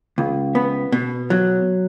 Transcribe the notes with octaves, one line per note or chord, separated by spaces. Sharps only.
C#2
B3
B2
F#3